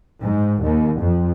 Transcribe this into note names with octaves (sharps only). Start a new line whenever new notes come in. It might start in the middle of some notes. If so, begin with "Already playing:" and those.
G#2
D#2
F2